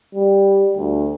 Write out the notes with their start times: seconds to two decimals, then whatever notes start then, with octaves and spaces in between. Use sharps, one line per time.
0.15 G3
0.77 D2